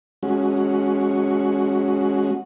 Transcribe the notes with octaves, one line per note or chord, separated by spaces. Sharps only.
G#3 C#4 F#4